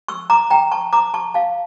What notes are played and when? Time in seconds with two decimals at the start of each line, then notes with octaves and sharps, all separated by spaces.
0.08 C#6 E6
0.30 A#5 D6
0.50 G5 A#5
0.72 A5 C#6
0.93 A#5 D6
1.14 A5 C#6
1.34 F5 A5